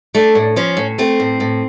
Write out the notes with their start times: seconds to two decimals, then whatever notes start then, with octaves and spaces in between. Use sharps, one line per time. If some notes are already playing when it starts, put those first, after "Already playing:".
0.15 A3 D4
0.35 A2
0.56 F3 C#4
0.77 A2
0.98 A3 C4
1.20 A2
1.40 A2